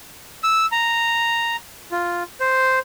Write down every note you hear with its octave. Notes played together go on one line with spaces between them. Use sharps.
E6
A#5
F4
C5